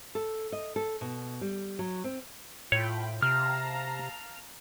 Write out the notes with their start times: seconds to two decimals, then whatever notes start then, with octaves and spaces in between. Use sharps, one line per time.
0.15 A4
0.52 D#5
0.76 A4
1.01 B2
1.41 G3
1.79 F#3
2.04 C4
2.72 A2 F4 C#5 G5 B5
3.22 C3 F5 A5 A#5 F6